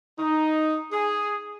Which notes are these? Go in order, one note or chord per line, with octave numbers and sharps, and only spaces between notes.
D#4
G#4